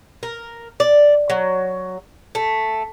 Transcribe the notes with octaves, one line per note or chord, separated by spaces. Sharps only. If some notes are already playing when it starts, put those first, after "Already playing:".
A#4
D5
F#3
A3